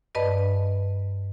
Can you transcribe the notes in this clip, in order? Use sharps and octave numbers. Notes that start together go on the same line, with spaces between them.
G2 B4 D5 D#5 A5